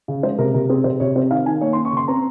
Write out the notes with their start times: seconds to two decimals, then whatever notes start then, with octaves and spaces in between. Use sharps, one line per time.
0.08 C#3
0.23 G#3 C5
0.38 C3 A#4
0.54 C3 A#4
0.69 C4 G#4
0.84 C3 C5
1.00 C3 C#5
1.15 C4 C5
1.31 D#3 F5
1.46 D#3 G#5
1.61 A#3 C#5
1.73 C6
1.76 C#4
1.85 C#6
1.92 C#3 C6
2.08 C4 A#5